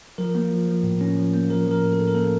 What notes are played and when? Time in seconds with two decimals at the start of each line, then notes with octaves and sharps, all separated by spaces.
0.18 F3 A#4
0.35 A#3
0.51 F3
0.68 F3
0.83 A2
1.01 C#4
1.17 F3
1.33 A#3
1.50 F3 A#4
1.66 F3
1.71 A#4
1.83 A2
1.93 A4
1.99 A2
2.07 A#4
2.15 A#3 A4